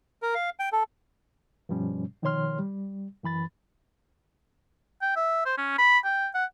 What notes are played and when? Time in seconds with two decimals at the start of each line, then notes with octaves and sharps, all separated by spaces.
0.22 A#4
0.35 F5
0.60 G5
0.72 A4
1.69 G2 B2 F3 G3 C#4
2.22 B2 D#3 F3 C#5 C6 F6
2.59 G3
3.23 F#2 E3 B5 A6
5.02 G5
5.16 E5
5.46 C5
5.58 C#4
5.78 B5
6.05 G5
6.35 F#5